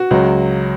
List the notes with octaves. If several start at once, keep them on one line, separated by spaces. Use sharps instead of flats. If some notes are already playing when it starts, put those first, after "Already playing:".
Already playing: F#4
C#2 C#3 F#3